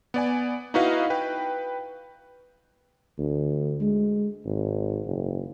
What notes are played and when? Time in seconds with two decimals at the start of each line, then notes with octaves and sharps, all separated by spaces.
0.14 B3 D5 G#5
0.74 D#4 E4 F#4 B4 D#5 F5
1.10 B4 G5
3.18 D2
3.81 G#3
4.45 G#1
5.06 F#1